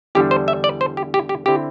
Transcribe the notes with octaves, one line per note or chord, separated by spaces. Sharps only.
E2 D3 G3 D4 G4
C5
E5
D5
C5
G4
G4
G4
D3 C4 E4 G4